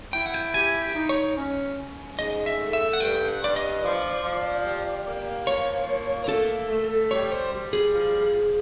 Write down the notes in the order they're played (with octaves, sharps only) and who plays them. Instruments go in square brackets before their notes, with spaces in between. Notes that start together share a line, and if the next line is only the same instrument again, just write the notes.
[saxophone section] E4 [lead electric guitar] G5
[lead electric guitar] F#5
G5
[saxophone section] G4 [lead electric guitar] G#5
[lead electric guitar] G5
[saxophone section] D#4
[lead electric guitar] C#5
[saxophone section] C#4
C#4
[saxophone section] G#2 [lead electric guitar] D#5
[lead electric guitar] E5
[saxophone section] A3
[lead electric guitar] E5
F#5
[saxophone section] G2 [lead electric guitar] G5
[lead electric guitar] F#5
[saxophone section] G2 [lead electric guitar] D5
[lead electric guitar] D#5
[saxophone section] F3 [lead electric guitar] D5
[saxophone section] F3
G4
A#3
[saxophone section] F3 [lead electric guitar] C#5
[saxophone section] A#3
[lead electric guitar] A#4
[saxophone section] A3 [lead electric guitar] A4
[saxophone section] A3
[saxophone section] G3 [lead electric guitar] C#5
[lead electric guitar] C5
[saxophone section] G3
[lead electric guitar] G#4
[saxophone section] F3
F3